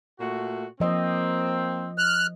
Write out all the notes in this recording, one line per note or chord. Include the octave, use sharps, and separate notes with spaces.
A#2 A3 F#4
F3 A#3 C4 D#5
F6 F#6